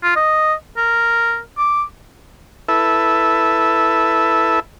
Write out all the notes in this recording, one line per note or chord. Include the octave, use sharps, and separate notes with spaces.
F4
D#5
A#4
D6
E4 A4 B4 E5